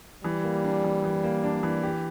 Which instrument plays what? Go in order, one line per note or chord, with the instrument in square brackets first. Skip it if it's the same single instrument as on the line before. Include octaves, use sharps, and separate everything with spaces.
[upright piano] E3 [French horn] G3
[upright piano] A#3
D4
E3
E3
A#3
D4
E3
G4